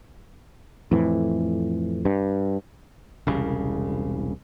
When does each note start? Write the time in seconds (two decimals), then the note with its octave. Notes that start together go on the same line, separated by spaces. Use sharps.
0.91 F2 A2 E3
2.05 G2
3.27 E1 C2 C#3